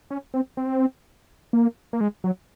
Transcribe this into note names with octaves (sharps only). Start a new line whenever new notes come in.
C#4
C4
C4
A#3
A#3
G#3
F#3